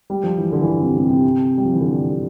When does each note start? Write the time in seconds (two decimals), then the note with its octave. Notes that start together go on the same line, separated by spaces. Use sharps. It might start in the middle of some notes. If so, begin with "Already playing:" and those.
0.10 G3
0.24 F3
0.38 E3
0.52 D3
0.61 E3
0.67 D3
0.81 C3
0.96 C3
1.10 C3
1.58 G3
1.65 F3
1.73 E3
1.81 D3
2.09 D3